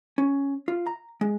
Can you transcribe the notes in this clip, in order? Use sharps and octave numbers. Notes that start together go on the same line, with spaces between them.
C#4
F4
A#5
G#3